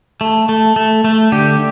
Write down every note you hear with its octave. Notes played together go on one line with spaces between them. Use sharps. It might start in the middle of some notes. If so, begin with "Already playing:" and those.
A3
A3
A3
A3
D3 G4